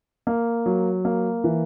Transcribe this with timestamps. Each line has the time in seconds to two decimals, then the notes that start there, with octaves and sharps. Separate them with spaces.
0.27 A#3
0.66 F#3
1.05 A#3
1.44 E3